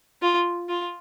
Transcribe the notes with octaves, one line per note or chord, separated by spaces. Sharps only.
F4
F4